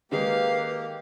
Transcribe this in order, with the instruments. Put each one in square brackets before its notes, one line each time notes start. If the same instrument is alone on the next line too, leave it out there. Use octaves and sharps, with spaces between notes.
[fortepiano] D#3 G#3 D#4 [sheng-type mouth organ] A#3 G4 [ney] B4 [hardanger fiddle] F5